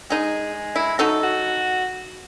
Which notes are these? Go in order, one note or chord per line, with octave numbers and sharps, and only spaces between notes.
G#3 D#4 G#4
E4
F#3 D#4 A4
F#4